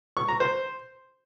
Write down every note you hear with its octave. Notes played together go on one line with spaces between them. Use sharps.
C#6
A#5
C5